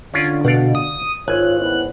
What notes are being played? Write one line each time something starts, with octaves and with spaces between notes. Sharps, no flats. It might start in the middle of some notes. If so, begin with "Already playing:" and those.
D3 C#4 F4 D5
B2 D5 F5 F#5
D#6
G#1 F4 C#5 G#5 F#6
B3 C#4 E4